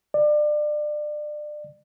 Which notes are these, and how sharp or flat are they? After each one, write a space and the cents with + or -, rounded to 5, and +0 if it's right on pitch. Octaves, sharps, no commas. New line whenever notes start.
D5 +30